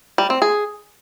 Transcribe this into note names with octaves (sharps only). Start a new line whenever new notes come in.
G3
C4
G#4